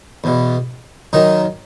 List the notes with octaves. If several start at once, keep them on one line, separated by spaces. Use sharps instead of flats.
E2 B2
F#2 D#3 D#4